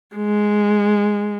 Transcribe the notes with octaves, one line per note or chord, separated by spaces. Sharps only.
G#3